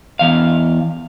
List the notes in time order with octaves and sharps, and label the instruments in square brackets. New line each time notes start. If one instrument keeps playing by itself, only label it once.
[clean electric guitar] E2 F5